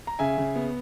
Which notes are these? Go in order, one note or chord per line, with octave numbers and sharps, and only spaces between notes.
A#5
C#3 E5 G#5
C#3
B3